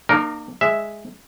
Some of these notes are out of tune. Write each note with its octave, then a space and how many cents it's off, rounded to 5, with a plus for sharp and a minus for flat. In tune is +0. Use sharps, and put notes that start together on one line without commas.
A#3 +0 D#4 -45 A#4 +0
G#3 +0 E5 +0